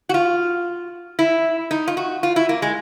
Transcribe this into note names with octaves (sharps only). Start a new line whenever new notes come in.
F#4
F4
E4
D#4
F4
F#4
F4
E4
A#3
G#3